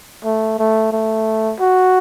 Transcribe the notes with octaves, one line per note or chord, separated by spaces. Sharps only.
A3
A3
A3
F#4